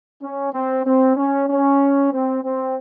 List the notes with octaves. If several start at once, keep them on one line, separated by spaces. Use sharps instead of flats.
C#4
C4
C4
C#4
C#4
C4
C4